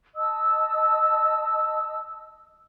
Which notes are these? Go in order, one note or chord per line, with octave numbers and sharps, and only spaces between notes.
D#5 A5 D#6 E6